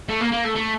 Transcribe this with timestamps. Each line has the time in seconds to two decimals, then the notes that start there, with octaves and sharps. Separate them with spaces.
0.09 A3
0.21 A#3
0.32 A#3
0.44 A3
0.56 A3